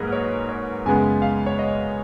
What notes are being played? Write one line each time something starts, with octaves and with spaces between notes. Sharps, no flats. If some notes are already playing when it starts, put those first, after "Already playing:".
Already playing: G#2 F#3 A#3 G#4 A#4 B4
C#5
C#5
F#2 C#3 G#3 B3 G#5
F5
C#5
D#5